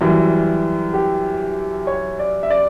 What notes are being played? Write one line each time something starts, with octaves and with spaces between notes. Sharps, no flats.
F#2 E3 G3
G4
C#5
D5
E5
D5